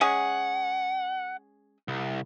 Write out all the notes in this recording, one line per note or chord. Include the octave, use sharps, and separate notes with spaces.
G#3 C#4 G#4 F#5
C2